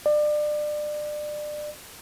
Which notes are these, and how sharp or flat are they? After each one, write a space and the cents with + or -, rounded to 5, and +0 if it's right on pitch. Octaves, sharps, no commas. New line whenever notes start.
D5 +30